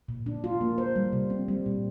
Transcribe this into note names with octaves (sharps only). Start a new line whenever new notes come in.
A#2
D4
F4
A#3
C5
G3
C3
C4
G3
A#2